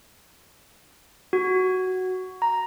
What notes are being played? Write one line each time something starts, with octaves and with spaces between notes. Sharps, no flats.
F#4
A#5